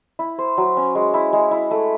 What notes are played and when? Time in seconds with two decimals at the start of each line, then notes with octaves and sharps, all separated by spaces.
0.19 E4
0.38 C5
0.58 F#3
0.77 C#4
0.95 G#3
1.14 E4
1.33 G#3
1.51 E4
1.71 A3